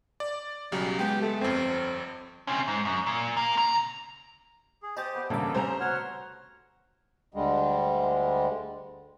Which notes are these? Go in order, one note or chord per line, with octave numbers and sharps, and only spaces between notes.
D5
B1 C#3 F#3 G3
G#3 B3 G4
A3
G1 F2 C4
C3 C#4
G#2
F#2
A#2
A#3
C#3 A#5
G#4
G4 C5 D#5 G#5 D#6 A6
B3 D5
A1 G2 A#2 C#3 A#3 A4 E5 D6
C3 G3 A3 C#4 C5 A#5
F#4 C#5 F#5 F6
D2 D3 G3 G#3